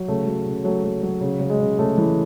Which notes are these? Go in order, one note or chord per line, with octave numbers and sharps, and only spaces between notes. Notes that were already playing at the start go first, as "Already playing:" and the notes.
Already playing: F#3
C#3 A3
F#3
C#3
F#3 A3
F#3
F#3
C#3
C#3
G#3
C#3
C#3 A3
E3